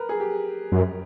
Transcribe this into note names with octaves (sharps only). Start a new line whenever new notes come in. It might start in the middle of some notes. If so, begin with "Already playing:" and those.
Already playing: A#4 B4
G#4
G4
F#2